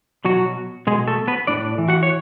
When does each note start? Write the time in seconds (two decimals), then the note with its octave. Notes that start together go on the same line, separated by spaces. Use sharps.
0.25 B2 F#3 F#4
0.87 B2 G#3 G#4
1.07 A3 A4
1.28 B3 B4
1.47 A2 D4 D5
1.78 E3
1.88 F#4 F#5
2.03 C#5